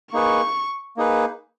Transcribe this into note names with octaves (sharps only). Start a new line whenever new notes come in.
A#3 D#4 G#4 B4 C#6
A#3 D#4 G#4 B4